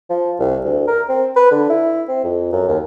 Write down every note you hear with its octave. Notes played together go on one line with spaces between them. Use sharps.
F3
C2
D2
A#4
C4
B4
D3
E4
C4
F2
F#2
D#2